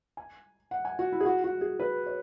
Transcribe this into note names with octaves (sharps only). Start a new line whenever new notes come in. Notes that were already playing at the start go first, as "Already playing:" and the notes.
G#5
F#5
G#5
F#4
E4
G#4
F#4
F#4
G#4
B4
C#5